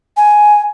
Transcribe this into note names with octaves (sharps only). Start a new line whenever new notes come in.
G#5